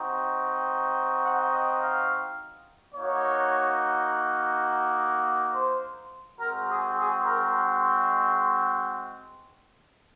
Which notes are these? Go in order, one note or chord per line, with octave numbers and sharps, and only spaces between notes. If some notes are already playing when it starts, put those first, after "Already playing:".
Already playing: C4 D#4 F#4
F#5
D#5
F5
A#3 D#4 F#4 C#5
C5
G#3 C4 F#4 A#4
G#4
G#4
A#4